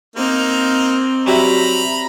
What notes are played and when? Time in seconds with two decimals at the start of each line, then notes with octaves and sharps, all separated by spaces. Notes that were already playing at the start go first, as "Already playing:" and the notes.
0.16 A#3 C4 D#4
1.26 F#3 G3 E4 A#5 B5